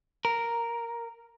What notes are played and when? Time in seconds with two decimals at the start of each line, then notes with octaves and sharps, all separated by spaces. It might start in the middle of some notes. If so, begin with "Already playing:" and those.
0.25 A#4